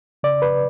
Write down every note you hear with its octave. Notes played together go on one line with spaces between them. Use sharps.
C#3 D5
B4